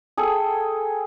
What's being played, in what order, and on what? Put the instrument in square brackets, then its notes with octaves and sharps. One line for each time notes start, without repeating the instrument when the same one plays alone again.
[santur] G#4 A4 G5